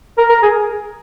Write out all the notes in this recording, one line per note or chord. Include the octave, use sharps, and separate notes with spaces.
A#4
A#4
G#4